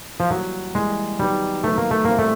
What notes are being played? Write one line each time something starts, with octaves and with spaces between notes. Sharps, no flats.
F3
E3 F#3 G3 A#3
E3 G3 G#3 A#3
D#3 F#3 G3 B3 D#4
D#3 F#3 A3 B3 D#4
A#3
A3
A#2 G3 A#3 C4 E4 G4
A3